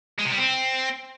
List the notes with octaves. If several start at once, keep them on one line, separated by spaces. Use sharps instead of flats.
G#3
C3
G3
C4